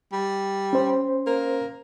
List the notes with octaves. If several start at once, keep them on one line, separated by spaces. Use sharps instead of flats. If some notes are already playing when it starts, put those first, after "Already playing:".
G3
C#4 C5
A#3